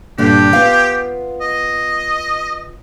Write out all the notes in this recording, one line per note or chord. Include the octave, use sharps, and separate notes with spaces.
G2 A#2 D3 G4
B3 F4 F5
D#5